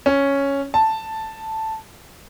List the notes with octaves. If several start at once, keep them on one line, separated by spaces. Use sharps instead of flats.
C#4
A5